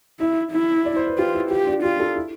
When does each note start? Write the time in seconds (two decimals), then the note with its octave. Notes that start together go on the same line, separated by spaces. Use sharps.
0.20 E4 E5
0.52 E4
0.85 D5
0.96 C5
1.07 B4
1.18 F4 G4
1.35 E4
1.51 F4 G4
1.67 D4
1.83 F4 G4
2.00 A4
2.16 E4